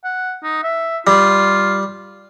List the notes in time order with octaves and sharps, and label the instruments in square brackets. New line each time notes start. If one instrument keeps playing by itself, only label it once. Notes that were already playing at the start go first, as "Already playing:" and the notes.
[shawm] F#5
D#4
E5
[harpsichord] G3 [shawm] F4